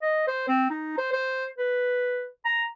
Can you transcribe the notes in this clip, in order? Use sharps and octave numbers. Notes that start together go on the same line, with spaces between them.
D#5
C5
C4
D#4
C5
C5
B4
A#5